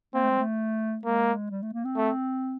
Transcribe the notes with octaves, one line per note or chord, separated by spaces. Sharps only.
A#3 C4
A3
G#3
A3
G#3 A#3
G3
A3
A#3
C4
A3